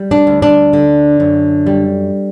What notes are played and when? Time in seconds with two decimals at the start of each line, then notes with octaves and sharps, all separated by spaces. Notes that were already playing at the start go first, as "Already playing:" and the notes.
Already playing: G3
0.11 D4
0.27 D2
0.42 D4
0.73 D3
1.20 F#2
1.67 G3